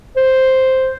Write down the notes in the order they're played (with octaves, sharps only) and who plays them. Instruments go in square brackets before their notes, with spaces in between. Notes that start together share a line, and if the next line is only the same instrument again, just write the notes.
[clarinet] C5